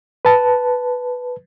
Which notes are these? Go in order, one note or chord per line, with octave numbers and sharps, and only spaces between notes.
B4 A5